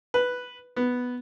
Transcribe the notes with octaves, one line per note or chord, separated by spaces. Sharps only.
B4
B3